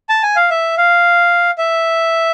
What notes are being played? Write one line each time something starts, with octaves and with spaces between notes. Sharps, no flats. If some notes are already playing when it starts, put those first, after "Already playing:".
A5
G#5
F5
E5
F5
E5